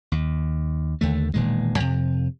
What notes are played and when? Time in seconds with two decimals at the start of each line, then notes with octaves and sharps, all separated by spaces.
0.12 D#2
1.01 D#2 D3 A3
1.34 E1 A#2 D#3 G#3
1.80 F2 C3